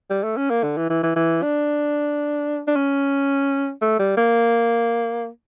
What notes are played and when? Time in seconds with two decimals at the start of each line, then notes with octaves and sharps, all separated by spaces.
0.10 G3
0.24 A3
0.37 C#4
0.50 A#3
0.63 D3
0.77 E3
0.90 E3
1.03 E3
1.16 E3
1.43 D4
2.67 D4
2.76 C#4
3.81 A3
3.99 G3
4.17 A#3